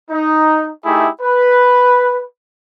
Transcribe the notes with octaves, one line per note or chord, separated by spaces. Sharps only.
D#4
A3 D#4 E4 G4 G#4
B4